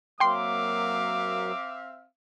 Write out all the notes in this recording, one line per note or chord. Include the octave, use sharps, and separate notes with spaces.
F#3 A#3 C4 E5 F5 G5 C6 D6